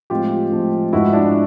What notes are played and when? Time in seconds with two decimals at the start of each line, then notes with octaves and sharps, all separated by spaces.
0.10 A2 F3 G#3 C4 F4 G4
0.52 A2 F3 G#3 C4
0.93 G#2 F3 G#3 B3 E4 F#4
1.13 D4 E4